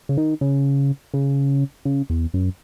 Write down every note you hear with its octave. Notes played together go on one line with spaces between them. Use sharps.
C#3
D#3
C#3
C#3
C#3
E2
F#2